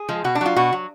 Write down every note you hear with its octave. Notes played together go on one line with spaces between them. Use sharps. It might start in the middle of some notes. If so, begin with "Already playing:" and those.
Already playing: G#4
F3 G#3
B2 F#4
D4
F#3 F4
B2 F#4
F#3